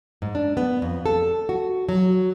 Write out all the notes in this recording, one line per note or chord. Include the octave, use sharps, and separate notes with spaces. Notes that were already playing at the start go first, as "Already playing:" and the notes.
G#2
D4
B3
F2
A4
F#4
F#3